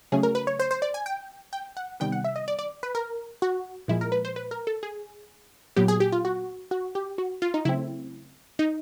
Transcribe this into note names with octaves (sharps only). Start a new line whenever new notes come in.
C#3 F#3 A3 C#4 G#4
A#4
B4
C#5
C5
C5
D5
G#5
G5
G5
F#5
C3 D#3 G3 B3 G5
F#5
E5
D#5
D5
D5
B4
A#4
F#4
A#2 F3 G#3 E4
A#4
B4
C5
B4
A#4
A4
G#4
A#2 F#3 B3 G4
G#4
G4
F4
F#4
F#4
G4
F#4
F4
D#4
C#3 F#3 A3 C4 E4
D#4